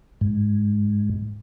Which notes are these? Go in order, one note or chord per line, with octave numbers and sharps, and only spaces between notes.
G#2